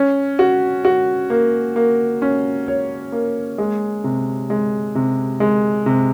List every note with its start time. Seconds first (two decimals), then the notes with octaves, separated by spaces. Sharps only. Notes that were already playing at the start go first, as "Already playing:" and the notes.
Already playing: C#4
0.39 F#4
0.85 F#4
1.30 A#3
1.76 A#3
2.22 C#4
2.68 C#5
3.12 A#3
3.58 G#3
4.04 C3
4.50 G#3
4.95 C3
5.40 G#3
5.86 C3